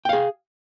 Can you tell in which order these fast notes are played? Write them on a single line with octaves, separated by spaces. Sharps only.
G5 F5 G#4